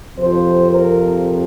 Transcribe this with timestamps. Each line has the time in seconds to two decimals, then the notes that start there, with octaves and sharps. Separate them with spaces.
0.17 F2 C3 F3 C5
0.70 A#4